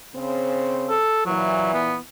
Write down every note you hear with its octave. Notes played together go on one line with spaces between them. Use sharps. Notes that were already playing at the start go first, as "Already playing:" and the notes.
C#3 C4
A4
A#2 E3 F#3
B3